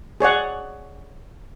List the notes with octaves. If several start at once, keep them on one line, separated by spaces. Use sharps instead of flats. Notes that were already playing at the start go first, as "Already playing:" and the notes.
G#4 C#5 D5 F#5